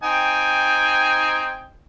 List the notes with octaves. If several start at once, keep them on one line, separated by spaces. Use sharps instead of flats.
C4 D#4 G5 G#5